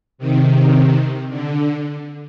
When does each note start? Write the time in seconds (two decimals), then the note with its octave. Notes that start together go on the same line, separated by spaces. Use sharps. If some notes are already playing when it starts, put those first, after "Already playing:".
0.18 C3 D#3
1.29 D3